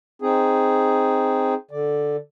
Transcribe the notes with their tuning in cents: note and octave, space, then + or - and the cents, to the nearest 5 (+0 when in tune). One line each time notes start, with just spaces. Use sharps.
C4 +0 D#4 +0 G#4 +0
D3 +0 D5 +0